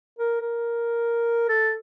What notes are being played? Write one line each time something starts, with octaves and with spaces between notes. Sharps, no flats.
A#4
A#4
A4